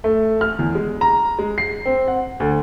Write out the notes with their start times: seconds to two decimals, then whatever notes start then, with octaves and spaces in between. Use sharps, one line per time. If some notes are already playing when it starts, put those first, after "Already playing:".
0.04 A3
0.41 F6
0.59 E2
0.75 G#3
1.01 A#5
1.39 G#3
1.58 C7
1.86 C4
2.08 F#5
2.40 D2